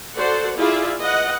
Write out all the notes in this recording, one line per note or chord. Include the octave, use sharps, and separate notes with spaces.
F#4 A4 C5 D5 F#5
E4 F4 G#4 D5 E5
B4 D#5 F#5